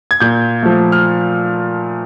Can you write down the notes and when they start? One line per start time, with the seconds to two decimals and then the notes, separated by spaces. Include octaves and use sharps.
0.11 G#6
0.20 A#2 G6
0.63 F3 A3
0.92 F6